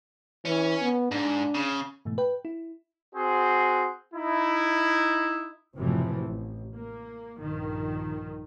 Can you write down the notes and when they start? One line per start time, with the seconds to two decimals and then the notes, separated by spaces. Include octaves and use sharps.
0.45 E3 C#4
0.82 B3
1.12 G#2 D4
1.54 C#3
2.05 G#2 B2 E3 A3
2.18 B4 G5
2.45 E4
3.14 C4 F#4 G#4 C5
4.14 D#4 E4
5.76 F#1 A2 C3 E3 F3 A3
6.24 A1
6.76 A#3
7.38 A#1 G2 D#3